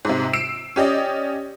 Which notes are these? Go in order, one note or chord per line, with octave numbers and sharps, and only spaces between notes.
G#2 C3
E6 C7 D7 E7
C#4 G4 D5 D#5